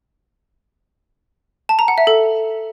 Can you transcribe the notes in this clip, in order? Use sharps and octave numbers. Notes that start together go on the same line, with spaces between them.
A5
A#5
F#5
E5
A4